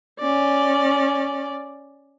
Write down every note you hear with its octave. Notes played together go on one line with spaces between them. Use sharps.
C#4 D5